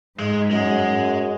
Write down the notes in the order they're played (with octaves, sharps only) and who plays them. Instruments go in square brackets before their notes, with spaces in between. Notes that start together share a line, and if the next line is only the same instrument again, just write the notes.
[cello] G#2 [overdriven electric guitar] G#3
[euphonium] F#2 [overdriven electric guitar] G#3